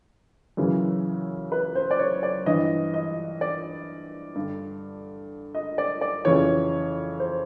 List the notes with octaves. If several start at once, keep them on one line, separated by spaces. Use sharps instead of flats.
F#2 C#3 E3
B4
C5
D5
C#5
D5
G2 E3 D#5
D#5
D5
G2 D3
D#5
D5
D5
F2 C#3 E3 C#5
C5